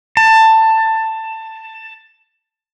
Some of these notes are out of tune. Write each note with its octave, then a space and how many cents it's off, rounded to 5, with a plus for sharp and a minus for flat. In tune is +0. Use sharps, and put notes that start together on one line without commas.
A5 +15